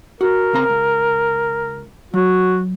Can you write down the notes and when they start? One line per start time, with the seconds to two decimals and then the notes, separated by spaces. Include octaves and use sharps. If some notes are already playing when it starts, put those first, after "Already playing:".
0.21 F#4 A#4
0.53 C#3 C4 A#5
0.70 C#2
2.14 F#3 F#4